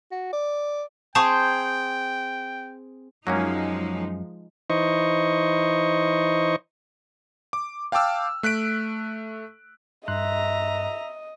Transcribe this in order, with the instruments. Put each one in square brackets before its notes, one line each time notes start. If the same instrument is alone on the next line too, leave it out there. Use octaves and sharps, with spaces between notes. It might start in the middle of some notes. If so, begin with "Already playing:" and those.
[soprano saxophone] F#4
D5
[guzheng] C4 G#4 C5 [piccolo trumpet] G5 [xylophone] A5 C#6
[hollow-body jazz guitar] F#2 [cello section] F3 G#3 D#4 [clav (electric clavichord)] F#3 A#3 C#4
[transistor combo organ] E3 D#4 C5 D#5 C#6
[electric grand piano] D6
F5 G5 A5 D6 E6 F6
A3 F#6 B6 D7
[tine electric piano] G2 C6 F#6 [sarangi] D#5 [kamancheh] E5 A#5